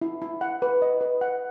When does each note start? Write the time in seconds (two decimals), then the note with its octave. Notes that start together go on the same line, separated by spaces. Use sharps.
0.02 E4
0.22 E4
0.41 F#5
0.62 B4
0.82 D#5
1.01 B4
1.21 F#5